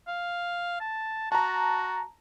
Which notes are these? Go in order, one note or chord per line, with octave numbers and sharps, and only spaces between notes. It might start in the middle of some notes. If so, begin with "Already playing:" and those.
F5
A5
F#4 A5 A#5